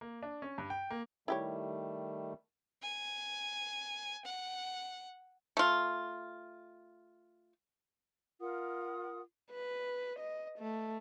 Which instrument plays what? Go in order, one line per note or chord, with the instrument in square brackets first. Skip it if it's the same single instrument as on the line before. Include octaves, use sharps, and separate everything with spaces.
[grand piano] A#3
D4
C#4
G2
G5
A#3
[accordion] D#3 G3 A3 [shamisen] E4 G4 C#5
[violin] G#5
F#5
[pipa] A3 F4
[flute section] F4 A#4 F#5 D#6
[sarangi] B4
D#5
A3